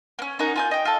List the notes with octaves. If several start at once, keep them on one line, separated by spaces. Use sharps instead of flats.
A#3 C#4
C#4 D#4 A#4 F#5
F4 G#5 G6
D#5 G5
F4 A4